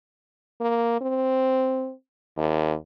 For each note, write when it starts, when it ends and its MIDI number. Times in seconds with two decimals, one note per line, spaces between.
0.61 0.98 58
1.01 1.92 60
2.37 2.74 39